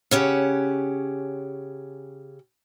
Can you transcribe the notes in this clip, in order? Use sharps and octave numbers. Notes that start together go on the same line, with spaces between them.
C#3 C#4 G4 F#5